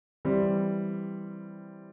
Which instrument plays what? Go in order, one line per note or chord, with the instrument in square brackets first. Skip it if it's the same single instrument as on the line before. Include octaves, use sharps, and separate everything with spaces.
[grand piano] E3 G3 C4